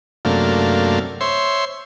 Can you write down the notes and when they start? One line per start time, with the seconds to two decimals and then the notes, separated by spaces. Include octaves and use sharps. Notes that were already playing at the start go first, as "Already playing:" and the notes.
0.25 F#2 C3 A3 A#3 D4 F5
1.21 C5 C#5 E5 C6